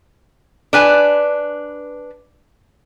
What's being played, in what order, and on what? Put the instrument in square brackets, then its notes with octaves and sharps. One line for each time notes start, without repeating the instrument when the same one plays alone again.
[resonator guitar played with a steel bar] D4 B4 G#5